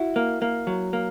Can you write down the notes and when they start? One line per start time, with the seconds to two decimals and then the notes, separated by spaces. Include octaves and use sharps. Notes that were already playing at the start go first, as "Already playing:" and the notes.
Already playing: E4 F#4
0.16 A#3
0.42 A#3
0.67 F#3
0.93 A#3